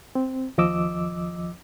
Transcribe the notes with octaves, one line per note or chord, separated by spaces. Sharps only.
C4
D#2 F3 D#5 D6 E6